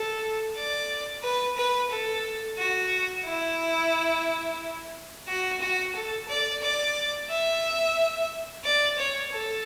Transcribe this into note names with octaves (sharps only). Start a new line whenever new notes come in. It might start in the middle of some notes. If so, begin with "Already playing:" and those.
Already playing: A4
D5
B4
B4
A4
F#4
E4
F#4
F#4
A4
D5
D5
E5
D5
C#5
A4